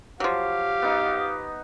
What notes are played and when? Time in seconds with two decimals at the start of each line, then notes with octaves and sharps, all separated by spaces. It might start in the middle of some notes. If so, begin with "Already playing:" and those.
0.20 F3 F#3 G4 F5
0.82 B3 D#4